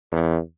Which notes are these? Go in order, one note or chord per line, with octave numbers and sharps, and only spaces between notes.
E2